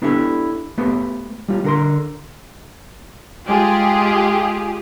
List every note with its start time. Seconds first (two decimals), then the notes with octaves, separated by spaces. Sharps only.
0.02 B3 D4 E4 G4 A4
0.78 A3 B3 G4 C5
1.48 G3 F4
1.64 D3 A#4 C6
3.47 G#3 F4 G4 G#4